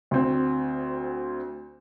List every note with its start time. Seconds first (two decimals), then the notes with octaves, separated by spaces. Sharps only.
0.11 D2 C4